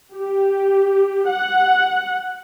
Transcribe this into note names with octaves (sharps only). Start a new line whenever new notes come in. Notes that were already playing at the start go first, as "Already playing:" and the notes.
G4
F#5